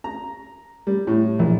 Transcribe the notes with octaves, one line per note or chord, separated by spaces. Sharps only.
A#5
G3
A2
A#1